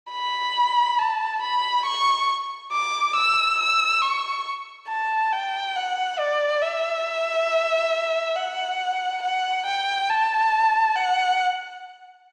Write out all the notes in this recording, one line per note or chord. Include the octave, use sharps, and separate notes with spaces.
B5
A5
B5
C#6
D6
E6
E6
C#6
A5
G5
F#5
D5
E5
F#5
F#5
G5
A5
F#5